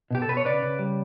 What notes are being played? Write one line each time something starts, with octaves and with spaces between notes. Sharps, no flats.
B2 G4
A4
B2 B4
C#5
C#3 B4 D5
C#3
G3